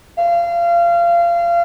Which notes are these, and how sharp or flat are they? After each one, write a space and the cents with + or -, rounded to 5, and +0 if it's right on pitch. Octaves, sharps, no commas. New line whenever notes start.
F5 -25